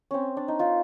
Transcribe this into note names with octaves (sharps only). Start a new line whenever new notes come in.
C4 C#4
D4
D#4
D#4 F4